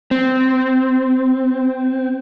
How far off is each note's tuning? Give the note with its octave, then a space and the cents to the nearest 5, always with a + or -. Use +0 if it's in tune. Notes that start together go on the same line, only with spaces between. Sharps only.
C4 -10